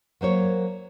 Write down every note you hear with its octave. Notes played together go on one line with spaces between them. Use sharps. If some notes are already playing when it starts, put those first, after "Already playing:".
F#3 A#3 C5 C#5